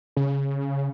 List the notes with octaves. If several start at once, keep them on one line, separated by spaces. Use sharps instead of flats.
C#3